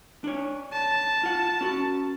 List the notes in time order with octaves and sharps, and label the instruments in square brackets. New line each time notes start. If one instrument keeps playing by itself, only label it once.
[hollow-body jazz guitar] D4 C#5
[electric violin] A5
[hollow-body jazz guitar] F4 F#5
C#4 F#4